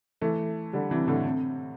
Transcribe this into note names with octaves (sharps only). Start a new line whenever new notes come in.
E3 A3
D3 G3
C3 E3
A2 D3
C3